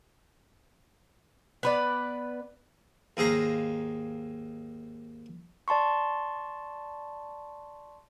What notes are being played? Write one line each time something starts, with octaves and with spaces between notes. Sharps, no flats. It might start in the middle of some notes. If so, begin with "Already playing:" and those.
B3 B4 D5
D#2 G#2 G#4 F5 A#5
D5 A5 C6 C#6